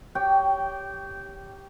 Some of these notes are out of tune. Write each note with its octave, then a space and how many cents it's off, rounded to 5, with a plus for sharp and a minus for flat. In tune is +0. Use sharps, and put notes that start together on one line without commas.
G4 +0 C#5 +20 G5 -15